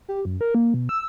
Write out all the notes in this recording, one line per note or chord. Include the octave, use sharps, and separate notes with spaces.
G4
F#2
A#4
A#3
B2
E6